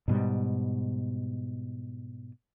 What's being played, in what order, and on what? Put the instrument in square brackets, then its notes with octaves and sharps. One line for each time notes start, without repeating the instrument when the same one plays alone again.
[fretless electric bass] G#2 B2 G3